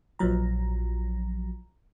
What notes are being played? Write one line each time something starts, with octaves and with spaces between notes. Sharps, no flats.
A#1 F3 F#3 A#5